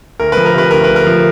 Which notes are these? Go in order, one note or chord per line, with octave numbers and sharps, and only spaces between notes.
D2 A#4
B4
F3
A#4
C3 B4
D2 A#4
B4
D2
A#4
F3